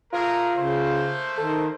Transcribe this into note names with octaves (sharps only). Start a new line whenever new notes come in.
A3 F4 G#4 A#4
C#3 A3 A#3 C5
D#3 A4